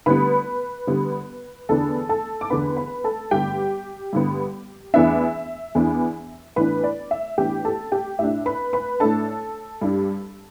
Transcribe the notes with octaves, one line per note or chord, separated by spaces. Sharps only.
D3 G3 B3 B4 B5
D3 G3 B3
E2 D3 B3 D4 A4 A5
A4 A5
D6
E2 D3 B3 D4 B4 B5
B4 B5
A4 A5
G2 D3 B3 G4 G5
G2 D3 B3
E2 E3 B3 D4 E5
E2 E3 B3 D4
A2 E3 B3 D4 B4 B5
D5
E5
A2 E3 B3 D4 G4 G5
A4 A5
G4 G5
A2 A3 D4 E5
B4 B5
B4 B5
A2 A3 D4 A4 A5
G2 G3 D4